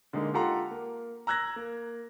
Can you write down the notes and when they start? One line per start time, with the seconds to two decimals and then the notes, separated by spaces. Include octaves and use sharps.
0.13 D3 G#3 A#3 D#4
0.34 F4 G4 A4 F#5 A#5 C6
0.71 A#3
1.27 A#5 E6 F#6 G#6 A#6
1.56 A#3